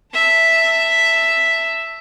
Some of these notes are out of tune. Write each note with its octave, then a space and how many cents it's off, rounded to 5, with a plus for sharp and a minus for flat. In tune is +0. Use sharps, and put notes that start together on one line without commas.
E5 +0 A5 +25